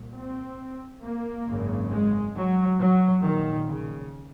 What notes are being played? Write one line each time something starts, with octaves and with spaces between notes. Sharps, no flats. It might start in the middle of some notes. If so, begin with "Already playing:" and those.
Already playing: C2 A#2
C4
A#3
G#1 F#2 C#3
G#3
F#3
F#3
A#1 A#2 D#3
C#3